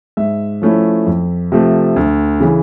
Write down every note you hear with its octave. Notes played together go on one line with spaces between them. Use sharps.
G#2 E5
F3 A3 C#4 E4
F2
C3 F3 A3
D2
C#3 E3